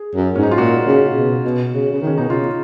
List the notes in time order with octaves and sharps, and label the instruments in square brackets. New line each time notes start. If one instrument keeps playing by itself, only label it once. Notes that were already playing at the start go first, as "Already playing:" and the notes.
Already playing: [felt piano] G#4
[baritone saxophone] F#2
[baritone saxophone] G#2 [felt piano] C#4
[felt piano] D#4
F4
[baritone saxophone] A#2 [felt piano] F#4
[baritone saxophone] C#3
B2
B2
C#3
C#3
D#3
[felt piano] C#4
[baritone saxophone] B2 [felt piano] D#4
[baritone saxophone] C#3 [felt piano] F4